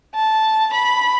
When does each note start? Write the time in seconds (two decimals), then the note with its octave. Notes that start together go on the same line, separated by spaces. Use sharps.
0.15 A5
0.73 B5